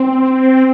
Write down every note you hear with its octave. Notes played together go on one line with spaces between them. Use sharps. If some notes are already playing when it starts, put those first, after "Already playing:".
Already playing: C4